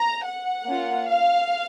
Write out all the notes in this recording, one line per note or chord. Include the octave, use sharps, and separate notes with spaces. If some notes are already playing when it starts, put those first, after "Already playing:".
Already playing: A#5
F#5
A#3 C#4 F4
F5